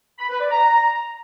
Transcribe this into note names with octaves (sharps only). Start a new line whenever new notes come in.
B5
B4
D5
A#5